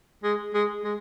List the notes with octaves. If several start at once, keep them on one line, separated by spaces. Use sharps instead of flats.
G#3
G#3
G#3